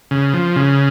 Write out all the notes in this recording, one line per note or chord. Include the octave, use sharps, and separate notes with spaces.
C#3
F3
C#3